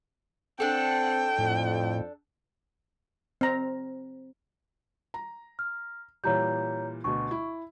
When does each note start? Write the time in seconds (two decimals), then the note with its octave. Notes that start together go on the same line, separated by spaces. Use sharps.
0.60 C4 D4 A4 F#5 G5
1.39 F2 A2
3.41 C4 A#5
5.14 A#5
5.59 F6
6.24 A#2 E3 G3 C#5 A#5 G6
7.04 D2 B2 C#6
7.31 E4